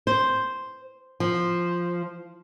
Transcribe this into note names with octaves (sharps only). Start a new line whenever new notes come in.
C5
F3